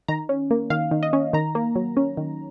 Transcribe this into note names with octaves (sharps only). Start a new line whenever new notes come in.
D#3 A#5
C#4
A#3
D#3 F5
D#3
D#5
C#4
D#3 A#5
A#3
F#3
C#4
D#3